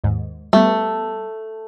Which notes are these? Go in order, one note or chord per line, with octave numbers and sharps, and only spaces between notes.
D#2 G#2
G3 A3 B3